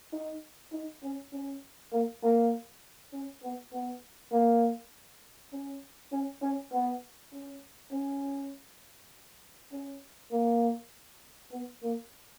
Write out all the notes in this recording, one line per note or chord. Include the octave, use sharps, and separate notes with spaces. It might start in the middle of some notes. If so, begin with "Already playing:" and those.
D#4
D#4
C#4
C#4
A#3
A#3
C#4
B3
B3
A#3
C#4
C#4
C#4
B3
C#4
C#4
C#4
A#3
B3
A#3